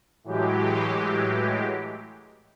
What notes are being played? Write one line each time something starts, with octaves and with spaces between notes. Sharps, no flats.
A2 E3 F#3 G#3 G4